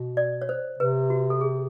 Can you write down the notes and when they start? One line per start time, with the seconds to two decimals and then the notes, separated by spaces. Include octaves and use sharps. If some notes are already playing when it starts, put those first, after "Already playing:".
Already playing: B2
0.17 D5
0.42 C#5
0.49 C5
0.79 C3 B4
1.10 F#4
1.30 A4
1.41 G#4